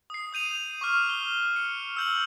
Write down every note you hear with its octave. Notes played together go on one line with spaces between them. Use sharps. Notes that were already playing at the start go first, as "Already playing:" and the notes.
D#6 C7
D#6 G6 D#7 F7
C#6 D6 F6
G7
C#7
E6 G6 F#7